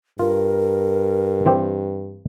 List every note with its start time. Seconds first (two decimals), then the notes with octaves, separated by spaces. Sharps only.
0.19 G2 F4 A#4
1.46 E3 C4 G4